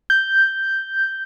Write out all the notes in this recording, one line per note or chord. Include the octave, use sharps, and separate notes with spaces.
G6